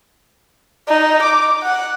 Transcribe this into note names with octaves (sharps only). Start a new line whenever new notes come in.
D#4
D6
F#5